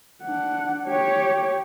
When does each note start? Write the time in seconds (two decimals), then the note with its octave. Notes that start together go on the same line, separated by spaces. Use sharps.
0.23 D4 F#5
0.87 G4 C#5